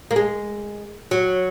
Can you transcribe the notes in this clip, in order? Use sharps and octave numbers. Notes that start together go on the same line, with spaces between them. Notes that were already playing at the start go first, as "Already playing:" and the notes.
A#3
G#3
F#3